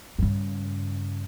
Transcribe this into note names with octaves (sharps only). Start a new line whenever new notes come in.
G2 C#3